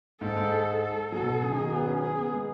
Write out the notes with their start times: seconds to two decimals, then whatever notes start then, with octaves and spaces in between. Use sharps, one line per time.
0.21 G#2 A4
0.37 G#2
0.82 A4
1.12 F#3 A4
1.22 B2
1.42 C#3 G#4
1.52 D#3
1.62 F#3
1.72 B3
1.87 C#4
2.02 C#4 G#4
2.18 B3
2.32 G#3